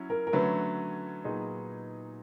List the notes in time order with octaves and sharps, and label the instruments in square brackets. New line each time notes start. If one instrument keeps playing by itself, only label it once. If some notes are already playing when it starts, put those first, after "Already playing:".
Already playing: [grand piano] F#3 C#4 E4
[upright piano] A#4
A#4
[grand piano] D3 F#3 A3 C#4 [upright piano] B4
[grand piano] A#2 F#3 B3 D#4 G#4